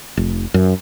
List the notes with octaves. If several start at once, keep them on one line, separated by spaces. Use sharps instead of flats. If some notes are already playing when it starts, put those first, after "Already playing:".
F1
F#2